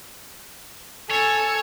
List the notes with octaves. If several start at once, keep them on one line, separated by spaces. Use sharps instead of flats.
A4 C#5 G#5